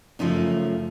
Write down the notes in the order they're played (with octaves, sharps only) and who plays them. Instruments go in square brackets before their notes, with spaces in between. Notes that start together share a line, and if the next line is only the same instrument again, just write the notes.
[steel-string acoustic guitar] F#2 C#3 F3 A3 D#4